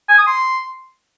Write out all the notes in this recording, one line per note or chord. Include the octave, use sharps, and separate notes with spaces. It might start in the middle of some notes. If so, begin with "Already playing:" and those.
G#5
D#6
C6